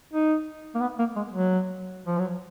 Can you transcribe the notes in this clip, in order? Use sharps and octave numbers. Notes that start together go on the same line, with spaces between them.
D#4
A#3
B3
A#3
G#3
F#3
F3
F#3